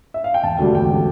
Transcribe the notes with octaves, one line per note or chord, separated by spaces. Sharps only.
E5
F5
G5
E1 A5
D2 D3 G3
E1 G5
D3 G3